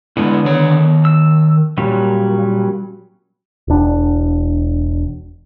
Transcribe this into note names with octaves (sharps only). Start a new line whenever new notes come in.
D3 G#3 B3 E4
D#3 C#5
E6
A#2 F#3 G3 C#4
E1 D4